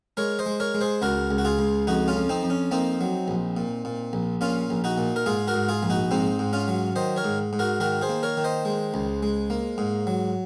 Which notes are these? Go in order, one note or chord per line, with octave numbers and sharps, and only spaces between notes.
G#3 A#4 C#5
C5 D#5
G#3
A#4 C#5
G#3
G#4 C5
C#2 F#4 A#4
C#2
F#4
F4 G#4
C#2
F2 D#4 F#4
C#4 F4
F2
C4 D#4
F2
C#4
A#3 C4 D#4
F#3
A#1
A#2
A#2
A#1
A#2 C#4 F4
A#1
D#4 F#4
A#2
A#4
G#2 F4 G#4
F#4 A#4
G#2
F4 G#4
A#1
D#4 F#4
G#2 C4 D#4
G#2
C#4 F4
F#3
D#3 C5 D#5
A#4 C#5
G#2
G#2
F#4 A#4
D#3 F#4 A#4
G#4 C5
A#3
A#4 C#5
D#3
C5 D#5
G#3
C#2
G#3
A#3
G#2
F#3